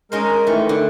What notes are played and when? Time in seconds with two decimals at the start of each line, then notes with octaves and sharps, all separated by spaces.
0.12 G#3 C#4 D#4 A#4 C5
0.47 D#3 E3 A3
0.69 D3